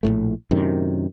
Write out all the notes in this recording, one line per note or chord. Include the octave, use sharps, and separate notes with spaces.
A#1 F#2 A2 A3
F#2 A2 C3 D#3